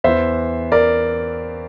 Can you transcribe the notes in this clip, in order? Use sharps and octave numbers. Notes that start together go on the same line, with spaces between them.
E2 E3 C5 E5
A#4 D5